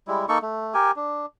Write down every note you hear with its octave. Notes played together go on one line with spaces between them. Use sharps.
G3 G#3 E4
A#3 D#4 A4 C#6
A3
G4 A#4 G#5
D4